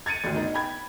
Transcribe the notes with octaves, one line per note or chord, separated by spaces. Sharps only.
G#6 A6 C#7 D#7
G#1 D2
B3 D#4
G5 B5 G#6